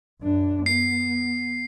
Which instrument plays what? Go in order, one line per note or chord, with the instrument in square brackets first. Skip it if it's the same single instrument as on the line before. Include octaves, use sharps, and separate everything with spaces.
[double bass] F#2 D4
[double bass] B3 [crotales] C7